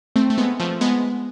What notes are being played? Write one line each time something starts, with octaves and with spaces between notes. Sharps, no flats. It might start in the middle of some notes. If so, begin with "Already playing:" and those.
A3 C4
A3
G#3 B3
F3 A3
G#3 B3